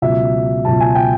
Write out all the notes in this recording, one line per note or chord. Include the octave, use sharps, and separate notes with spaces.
C#2 B2 F#3 E5
C#2 B2 F#3 A5
G#5
G5